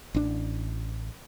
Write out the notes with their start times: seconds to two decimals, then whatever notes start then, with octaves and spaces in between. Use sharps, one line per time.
0.14 A1 D4